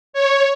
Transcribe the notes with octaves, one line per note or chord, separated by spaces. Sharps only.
C#5